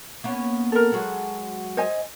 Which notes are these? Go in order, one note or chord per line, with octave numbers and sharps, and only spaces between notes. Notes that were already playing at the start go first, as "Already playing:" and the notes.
A#3 B3 C#4
A4 A#4
F#3 G#3 F#4
C5 D#5 G#5